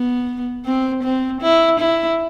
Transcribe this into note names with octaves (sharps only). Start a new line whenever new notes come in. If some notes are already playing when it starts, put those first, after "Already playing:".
Already playing: B3
C4
C4
E4
E4